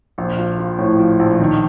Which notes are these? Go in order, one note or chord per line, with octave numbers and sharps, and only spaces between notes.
A#1
F3
F3
A2
F3
A#1
D#3